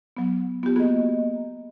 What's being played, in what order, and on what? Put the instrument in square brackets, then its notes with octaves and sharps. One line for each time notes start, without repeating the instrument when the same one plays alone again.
[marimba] F#3 B3
[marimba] B3 G4 [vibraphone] F4
[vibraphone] A#3 D#5 [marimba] B3 F#4 G#4